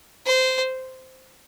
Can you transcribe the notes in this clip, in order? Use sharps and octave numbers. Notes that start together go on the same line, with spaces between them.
C5